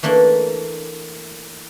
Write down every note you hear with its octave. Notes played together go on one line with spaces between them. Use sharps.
E3 A3 A#3 D4